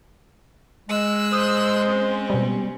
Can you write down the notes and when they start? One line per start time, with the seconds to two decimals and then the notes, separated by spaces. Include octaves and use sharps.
0.89 G#3 E6 F#6
1.33 C5 D#6
1.86 C4 C#4
2.30 B2 G3